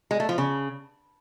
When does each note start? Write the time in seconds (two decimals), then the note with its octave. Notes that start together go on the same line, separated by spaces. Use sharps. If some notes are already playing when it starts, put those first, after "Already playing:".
0.11 G#3
0.20 A3
0.29 F3
0.38 C#3